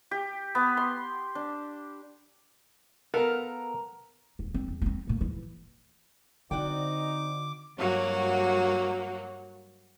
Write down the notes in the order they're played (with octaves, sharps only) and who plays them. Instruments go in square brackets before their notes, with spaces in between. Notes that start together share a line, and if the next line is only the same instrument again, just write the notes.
[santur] G4
B3
C6
D4
[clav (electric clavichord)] B3 A4 F5 [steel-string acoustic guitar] A#4 A#5
[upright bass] D#1
C4 D4
E2
B3 C4
A#2 A3
E3
[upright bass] D3 [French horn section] C4 D#4 [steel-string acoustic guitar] F#4 D5 G5 [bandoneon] D6
[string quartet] G2 F#3 A#3 F#4